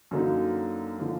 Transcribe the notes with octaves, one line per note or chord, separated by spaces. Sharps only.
F#2 D3 F#3 A#3 D#4
D3 F3 A#3